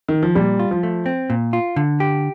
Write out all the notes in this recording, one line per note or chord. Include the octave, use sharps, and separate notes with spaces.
D#3
F3
A#2 G3
F4
F3
A3
C4
A#2
F4
D3
G4